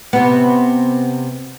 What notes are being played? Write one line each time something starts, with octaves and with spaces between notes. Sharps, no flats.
C3 B3